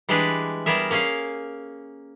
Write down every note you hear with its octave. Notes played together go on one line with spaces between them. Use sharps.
E3 G3 G#3 D4 G#4 B4
G3 B3 G#4 A#4 E5
A#3 C#4 G#4 F5